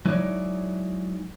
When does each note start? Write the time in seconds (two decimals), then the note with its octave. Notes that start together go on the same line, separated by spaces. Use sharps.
0.06 F#3 G#3 D#4 E4 C#5 D5